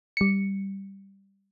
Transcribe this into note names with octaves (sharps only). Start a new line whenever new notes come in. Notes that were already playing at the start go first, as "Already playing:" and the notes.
G3 C#7